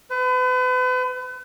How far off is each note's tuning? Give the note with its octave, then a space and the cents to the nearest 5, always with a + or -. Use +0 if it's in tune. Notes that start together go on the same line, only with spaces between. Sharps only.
B4 +40